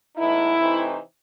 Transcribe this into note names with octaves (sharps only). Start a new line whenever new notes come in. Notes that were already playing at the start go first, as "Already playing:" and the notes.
A2 E3 G#3 B3 D#4 E4
C3 E3 A3 C4 D#4